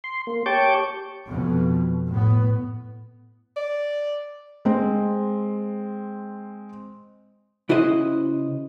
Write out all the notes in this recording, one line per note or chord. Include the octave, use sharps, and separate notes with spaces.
C6
A#3
G4 C#5 A5 C#6 D6 G6
F2 B2
A2 B3
D5
G#3 C4
C#3 E4 F#4 C5 D#5